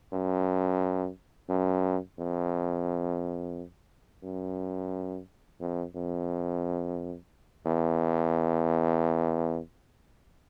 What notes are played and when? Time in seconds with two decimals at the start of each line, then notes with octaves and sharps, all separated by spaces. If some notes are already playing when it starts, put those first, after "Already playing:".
0.13 F#2
1.50 F#2
2.19 F2
4.24 F#2
5.60 F2
5.96 F2
7.66 E2